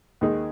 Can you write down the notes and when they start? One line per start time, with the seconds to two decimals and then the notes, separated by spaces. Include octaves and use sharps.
0.21 D#2 D#3 G#3 D#4 G#4